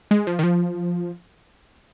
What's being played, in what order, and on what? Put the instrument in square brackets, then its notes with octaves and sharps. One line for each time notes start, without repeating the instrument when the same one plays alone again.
[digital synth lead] G#3
F3
D#3
F3